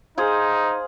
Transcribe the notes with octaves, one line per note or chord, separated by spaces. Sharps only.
D#4 G#4 C5 F5